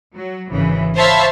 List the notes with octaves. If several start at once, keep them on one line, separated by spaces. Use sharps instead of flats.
F#3
G#1 C#3 E3
C5 C#5 E5 F5 A5 B5